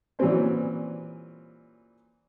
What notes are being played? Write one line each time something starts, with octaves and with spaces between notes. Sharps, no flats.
A#2 E3 F#3 G3 C4 C#4